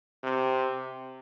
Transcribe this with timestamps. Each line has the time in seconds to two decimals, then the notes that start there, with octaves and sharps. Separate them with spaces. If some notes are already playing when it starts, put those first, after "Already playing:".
0.23 C3